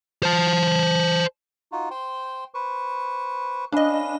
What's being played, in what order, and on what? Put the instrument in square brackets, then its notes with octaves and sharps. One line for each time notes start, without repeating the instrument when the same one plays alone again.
[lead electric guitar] C5 A5
[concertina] D#4 F4 F#4
C5 G5 C6
B4 C5 C#6
[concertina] C#4 B4 F5 [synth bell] D4 D#5